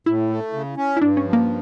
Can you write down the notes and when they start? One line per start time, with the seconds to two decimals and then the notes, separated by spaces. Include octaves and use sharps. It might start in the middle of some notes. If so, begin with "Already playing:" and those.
0.06 A2 E4
0.29 A3
0.53 C#3
0.77 C#4
0.96 E4
1.01 G2 D4
1.17 C#4
1.25 F3
1.33 A#3